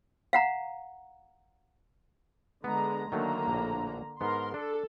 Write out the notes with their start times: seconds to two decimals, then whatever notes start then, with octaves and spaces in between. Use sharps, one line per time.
0.33 F5 F#5 A#5
2.64 D3 G#3 B3 A#5
3.12 D3 D#3 F#3 A3 A#3 A#5
3.48 A#1 A2
4.21 G#2 B3 A#4 C6
4.54 D4 A4